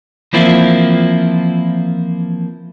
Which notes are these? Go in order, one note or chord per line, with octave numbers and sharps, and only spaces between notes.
E3 F3 A#3 C4 E4 F4